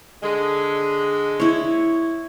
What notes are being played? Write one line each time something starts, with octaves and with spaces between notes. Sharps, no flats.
D3 G#3
E4 C#5